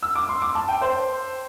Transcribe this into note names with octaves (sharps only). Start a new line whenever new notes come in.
E6
D6
C6
D6
A5
G5
C5